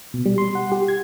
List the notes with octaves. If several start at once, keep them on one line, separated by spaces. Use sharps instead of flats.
B2
G3
C6
F#5
G4
G#6